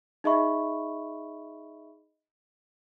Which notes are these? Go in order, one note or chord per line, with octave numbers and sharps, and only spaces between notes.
D#4 G#4 D#5 E5 B5 C#6